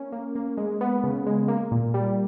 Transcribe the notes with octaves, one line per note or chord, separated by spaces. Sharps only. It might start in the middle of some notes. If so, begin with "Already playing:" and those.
Already playing: A#3 C#4
A#3
A#3
G#3
B3
C#3
G#3
A#3
A#2
G3